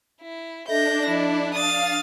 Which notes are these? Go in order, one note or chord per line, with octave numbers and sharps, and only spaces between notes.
E4
D4 A4 D#5 E5 G6 A#6
F3 E4 D#5
F5 D#6 A6